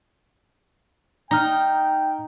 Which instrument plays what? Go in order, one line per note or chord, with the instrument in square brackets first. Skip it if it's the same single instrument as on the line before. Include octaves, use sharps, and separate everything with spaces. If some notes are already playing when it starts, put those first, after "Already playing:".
[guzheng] D#4 [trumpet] G5 [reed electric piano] A#5 F6